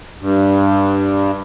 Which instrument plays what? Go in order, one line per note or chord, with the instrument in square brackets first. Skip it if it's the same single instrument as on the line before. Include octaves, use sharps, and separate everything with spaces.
[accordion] G2